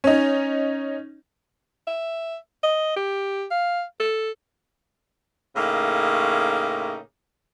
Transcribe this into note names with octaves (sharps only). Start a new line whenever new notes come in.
C#4 D#4
E5
D#5
G4
F5
A4
A2 C#3 A#3 D#4